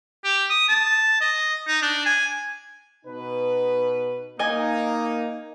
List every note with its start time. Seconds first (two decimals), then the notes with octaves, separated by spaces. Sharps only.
0.24 G4
0.50 D#6
0.69 A5
1.21 D#5
1.67 D#4
1.82 D4
2.06 G#5
3.05 B2 D#4 B4
4.39 A#3 D#4 D#5 G#5